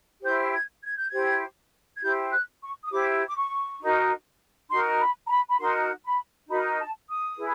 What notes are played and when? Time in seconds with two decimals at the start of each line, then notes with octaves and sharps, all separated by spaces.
0.23 E4 G4 C5 G6
0.53 G#6
0.83 G#6
0.95 G6
1.08 E4 G4 C5 G#6
1.96 G#6
2.02 E4 G4 C5 G6
2.31 F#6
2.61 C#6
2.83 D#6
2.91 E4 G4 C5 D6
3.27 D6
3.36 C#6
3.80 D#4 F#4 A#4
4.70 D#4 F#4 A#4 C6
4.99 B5
5.25 A#5
5.29 B5
5.49 B5
5.58 D#4 F#4 A#4 C6
6.03 B5
6.48 D#4 F#4 A#4 B5
6.78 A5
7.08 D#6
7.38 E4 G#4 B4